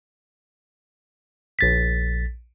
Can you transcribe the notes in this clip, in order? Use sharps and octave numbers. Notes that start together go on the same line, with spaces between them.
A#1 A6 B6